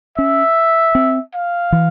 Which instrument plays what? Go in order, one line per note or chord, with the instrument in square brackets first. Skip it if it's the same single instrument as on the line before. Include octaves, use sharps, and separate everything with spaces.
[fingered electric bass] C#4 [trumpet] E5
[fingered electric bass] C4
[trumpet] F5
[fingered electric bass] E3